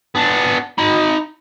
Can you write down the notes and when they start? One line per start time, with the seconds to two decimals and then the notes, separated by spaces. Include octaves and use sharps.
0.15 B3 D4
0.78 D#4 B5